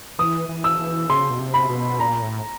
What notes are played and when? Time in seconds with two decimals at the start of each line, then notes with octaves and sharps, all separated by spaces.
0.19 E3 D#6
0.49 E3
0.64 E6
0.79 E3
1.09 C#3 C6
1.30 B2
1.39 C3
1.54 B5
1.69 B2
1.99 A#2 A#5
2.22 A2